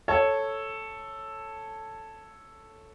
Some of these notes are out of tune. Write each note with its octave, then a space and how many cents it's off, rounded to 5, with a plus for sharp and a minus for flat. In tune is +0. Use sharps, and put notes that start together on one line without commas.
A4 +0 C#5 -5